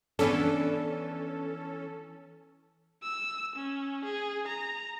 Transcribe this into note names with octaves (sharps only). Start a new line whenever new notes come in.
E3 B3 C#4 D4 A4
E6
C#4
G#4
A#5